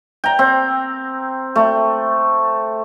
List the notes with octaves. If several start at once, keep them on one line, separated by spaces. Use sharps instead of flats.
G5 A#5
C4
A3